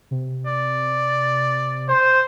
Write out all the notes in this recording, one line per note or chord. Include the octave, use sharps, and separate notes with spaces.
C3
D5
C5